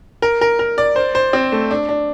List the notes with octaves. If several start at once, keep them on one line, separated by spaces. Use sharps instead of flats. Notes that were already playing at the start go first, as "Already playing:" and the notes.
A#4
A#4
A#4
D5
C5
C5
C4
A3
D4
D4